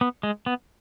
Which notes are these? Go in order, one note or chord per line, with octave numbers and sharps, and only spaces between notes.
B3
G#3
B3